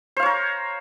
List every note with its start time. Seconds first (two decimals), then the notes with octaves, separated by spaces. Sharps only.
0.17 C5
0.20 F5
0.23 C#5
0.26 A#4